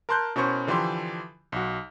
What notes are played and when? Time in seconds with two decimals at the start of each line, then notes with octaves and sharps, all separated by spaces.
0.09 A#4 A5 C6 F#6 G6
0.36 B2 C#4 E4 A#4 C5 C#6
0.67 D3 E3 F3 G4 C6
1.52 B1 F#4